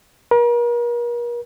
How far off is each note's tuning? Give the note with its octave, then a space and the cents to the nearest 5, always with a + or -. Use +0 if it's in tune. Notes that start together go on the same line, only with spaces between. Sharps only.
A#4 +40